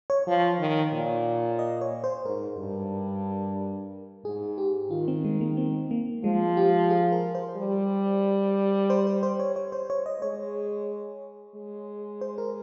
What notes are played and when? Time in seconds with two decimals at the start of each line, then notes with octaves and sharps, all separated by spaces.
0.10 C#5
0.27 F3
0.59 D#3
0.93 A#2
1.59 D#5
1.81 C#5
2.04 C5
2.25 G#2 A#4
2.58 G2
4.25 G#2 G#4
4.58 G4
4.91 D#3 F4
5.08 C4
5.24 G#3
5.41 A#3
5.57 C4
5.91 A#3
6.24 F3 G#3
6.57 G4
6.90 G#4
7.12 A#4
7.35 C5
7.57 G3
8.90 C5
9.07 C5
9.23 C5
9.40 C#5
9.56 C#5
9.72 C5
9.90 C#5
10.06 D#5
10.22 G#3 C#5
11.55 G#3
12.21 C5
12.38 A#4